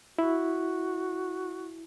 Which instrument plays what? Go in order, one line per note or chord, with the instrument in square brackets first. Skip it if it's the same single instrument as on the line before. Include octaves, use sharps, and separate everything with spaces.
[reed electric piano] E4 [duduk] F#4